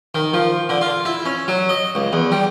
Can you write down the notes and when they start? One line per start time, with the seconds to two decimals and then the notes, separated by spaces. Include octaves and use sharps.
0.15 D#3
0.34 F3
0.69 D3
0.81 F4
1.05 E4
1.26 C#4
1.48 F#3
1.69 D#5
1.95 C#2
2.13 E2
2.32 G3